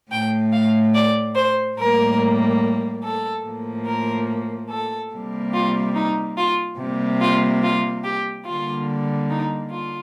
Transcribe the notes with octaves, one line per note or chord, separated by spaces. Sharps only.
A2 A3 G5
F5
D5
C5
A2 G3 A#3 A#4
A4
A2 F3 A#3
A#4
A4
C3 G3 A#3
F4
D#4
F4
C3 G3 A#3
F4
F4
G4
D3 G3 A#3 F4
D#4
F4